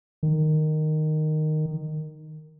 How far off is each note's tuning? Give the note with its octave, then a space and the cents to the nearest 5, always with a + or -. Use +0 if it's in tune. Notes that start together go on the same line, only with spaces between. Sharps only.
D#3 -10